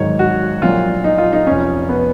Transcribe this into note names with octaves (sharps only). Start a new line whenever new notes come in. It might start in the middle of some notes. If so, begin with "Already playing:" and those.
Already playing: G#1 G#2 D#3 F#3 C#5
F#4
A#1 A#2 F#3 F4
D#4
F4
D#4
F1 F2 F3 C#4
B3